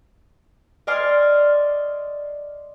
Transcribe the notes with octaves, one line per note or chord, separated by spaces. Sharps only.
D5 D#5 G#5 C6 F6